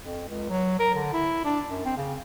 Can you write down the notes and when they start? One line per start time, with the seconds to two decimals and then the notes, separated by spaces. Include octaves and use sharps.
0.03 F2
0.28 C#2
0.49 F#3
0.79 A#4
0.95 D3
1.13 E4
1.45 D4
1.70 F#2
1.85 C4
1.97 C#3